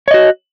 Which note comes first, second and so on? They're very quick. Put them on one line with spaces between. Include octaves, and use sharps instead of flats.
C#5 D#5 F#4